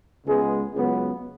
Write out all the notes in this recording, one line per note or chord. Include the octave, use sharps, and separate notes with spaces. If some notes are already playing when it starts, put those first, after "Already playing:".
C#2 C#3 G#3 B3 G#4
C#2 C#3 F#3 B3